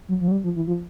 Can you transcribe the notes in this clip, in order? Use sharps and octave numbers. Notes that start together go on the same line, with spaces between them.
F#3
F3
F#3
G3
F3
E3
F3